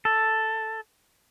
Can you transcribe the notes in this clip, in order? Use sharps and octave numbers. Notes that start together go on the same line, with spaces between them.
A4